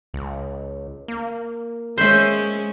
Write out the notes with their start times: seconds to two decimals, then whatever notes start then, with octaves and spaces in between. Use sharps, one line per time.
0.14 C#2
1.08 A#3
1.98 G#3 C#4 C5 E5